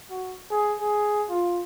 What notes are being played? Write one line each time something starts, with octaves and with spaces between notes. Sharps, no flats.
F#4
G#4
G#4
F4